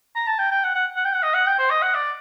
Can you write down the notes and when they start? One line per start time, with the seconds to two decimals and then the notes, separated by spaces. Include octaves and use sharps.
0.15 A#5
0.27 A5
0.39 G5
0.51 G5
0.64 F#5
0.75 F#5
0.96 F#5
1.05 G5
1.13 F#5
1.23 D#5
1.34 F#5
1.47 G5
1.59 C5
1.70 D#5
1.82 F#5
1.95 D5